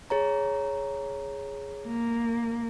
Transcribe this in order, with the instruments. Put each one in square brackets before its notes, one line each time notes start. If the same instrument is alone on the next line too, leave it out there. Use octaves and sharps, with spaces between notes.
[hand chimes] G#4 C#5 A#5
[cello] A#3